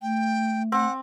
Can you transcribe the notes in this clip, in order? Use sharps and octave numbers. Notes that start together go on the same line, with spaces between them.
A3 G5
C4 F#5